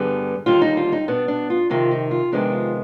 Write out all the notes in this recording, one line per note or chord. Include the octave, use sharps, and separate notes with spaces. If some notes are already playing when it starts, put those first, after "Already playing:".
Already playing: G2 D3 G3 B3 G#4
D#2 D3 G3 F4
D#4
F4
D#4
B2 B3 D4
D4
F4
F2 C3 D#3 F4
D#4
F4
F2 C3 D#3 G#3 B3 D4
F4